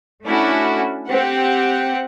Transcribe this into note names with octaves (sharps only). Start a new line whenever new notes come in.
A3 C#4 D4 E4 F#4
C4 G4 F#5